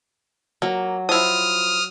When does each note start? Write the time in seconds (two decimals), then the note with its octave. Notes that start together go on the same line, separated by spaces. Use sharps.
0.62 F#3 A#3
1.09 F3 E4 D#6 F6